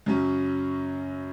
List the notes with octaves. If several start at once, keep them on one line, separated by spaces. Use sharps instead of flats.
F#2 C#3 F#3 C#4